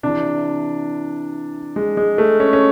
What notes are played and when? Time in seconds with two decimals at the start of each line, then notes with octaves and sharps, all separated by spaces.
0.03 C3 E3 D4
1.76 G#3
1.97 G#3
2.18 A3
2.40 C#4
2.53 C#4